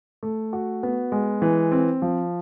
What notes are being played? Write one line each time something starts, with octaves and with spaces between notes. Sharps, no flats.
A3
F#4
B3
G#3
E3
C4
F3